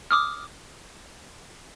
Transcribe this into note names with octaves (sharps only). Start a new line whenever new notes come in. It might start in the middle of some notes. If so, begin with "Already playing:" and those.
D6 D#6 F6